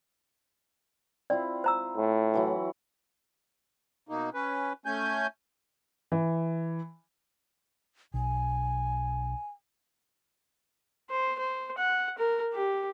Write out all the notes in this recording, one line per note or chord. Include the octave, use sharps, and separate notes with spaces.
C4 E4 F4 D5
C5 A#5 E6
A2
E3 F#3 E4
B2 A#3 D#4
C#4 B4
A3 C#4 G#5 G6
E3
B1 G#5
C5
C5
F#5
A#4
G4